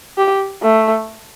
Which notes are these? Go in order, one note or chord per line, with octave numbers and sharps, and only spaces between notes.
G4
A3